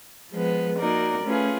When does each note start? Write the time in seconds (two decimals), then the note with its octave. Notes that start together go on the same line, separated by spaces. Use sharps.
0.32 F3 G#3 B3
0.78 A#3 D#4 F#4 A#4 D5
1.24 A3 C#4 F4 G#4 B4